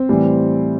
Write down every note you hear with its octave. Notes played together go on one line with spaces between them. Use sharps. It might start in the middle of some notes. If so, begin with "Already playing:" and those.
Already playing: C4 C5
A2 E3 G3